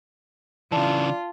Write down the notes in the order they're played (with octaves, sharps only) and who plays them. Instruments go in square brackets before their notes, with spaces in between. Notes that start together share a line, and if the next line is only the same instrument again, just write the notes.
[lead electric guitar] C#3 E3 [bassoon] D4 [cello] F4 [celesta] A5